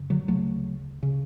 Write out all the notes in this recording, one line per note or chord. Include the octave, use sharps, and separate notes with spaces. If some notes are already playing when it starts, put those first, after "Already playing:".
Already playing: F#2 C#3
D3 F#3
D2 C#3 F#3 A3
C#3